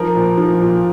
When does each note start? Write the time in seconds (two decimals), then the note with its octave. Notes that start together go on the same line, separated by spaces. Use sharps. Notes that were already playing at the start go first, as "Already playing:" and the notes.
Already playing: F3 A#4
0.15 A#2
0.38 F3
0.61 A#2